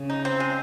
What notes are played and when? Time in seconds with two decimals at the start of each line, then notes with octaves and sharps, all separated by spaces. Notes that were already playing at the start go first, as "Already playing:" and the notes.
Already playing: C#3
0.10 D#4
0.25 C4
0.40 G#3